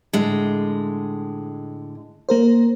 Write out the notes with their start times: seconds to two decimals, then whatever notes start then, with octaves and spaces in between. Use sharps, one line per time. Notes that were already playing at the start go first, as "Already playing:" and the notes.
0.13 A2 D3 G#3
2.29 A#3 A#4 C5